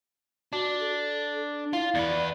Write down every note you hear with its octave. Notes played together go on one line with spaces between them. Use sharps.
D4 F#4
A4
E4 F4
E2 B4 D5